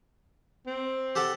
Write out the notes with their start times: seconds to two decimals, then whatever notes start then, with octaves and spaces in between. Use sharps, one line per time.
0.67 C4
1.15 G4 A4 F#5